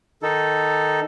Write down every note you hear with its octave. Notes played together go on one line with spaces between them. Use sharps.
D#3 D#4 A4